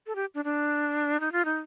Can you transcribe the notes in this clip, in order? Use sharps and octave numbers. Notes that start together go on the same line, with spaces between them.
A4
G4
D4
D4
D#4
F4
D#4